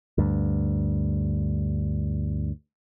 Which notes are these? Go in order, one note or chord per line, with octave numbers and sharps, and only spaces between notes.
D2 G2